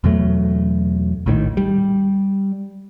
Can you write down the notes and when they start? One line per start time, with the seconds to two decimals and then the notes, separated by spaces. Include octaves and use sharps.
0.04 E2 B2 F#3 A3
1.26 A#1 A2 D3 D#3
1.57 G3